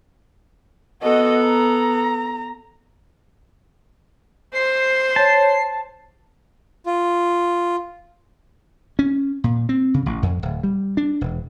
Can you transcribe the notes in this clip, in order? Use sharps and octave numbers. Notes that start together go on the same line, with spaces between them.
B3 F#4 A4 D#5
A#5
C5 C7
C#5 A5
F4
C#4
A#2
C4
C#3
A1
F2
D1
G3
D4
E1